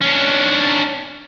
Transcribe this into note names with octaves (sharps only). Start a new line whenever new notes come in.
C#4 D4